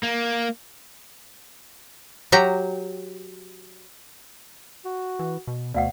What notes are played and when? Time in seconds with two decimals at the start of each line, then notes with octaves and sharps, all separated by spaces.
0.03 A#3
2.32 F#3 G4 A#5
4.85 F#4
5.19 E3
5.47 B2
5.74 D2 B2 D5 F5 F#5